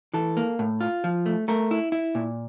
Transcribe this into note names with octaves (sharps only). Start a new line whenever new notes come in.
E3 A4
A#3
A2
F4
F3
A3
A3 A#4
E4
E4
A#2